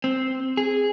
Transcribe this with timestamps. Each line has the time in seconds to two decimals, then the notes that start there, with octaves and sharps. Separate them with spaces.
0.04 C4
0.57 G#4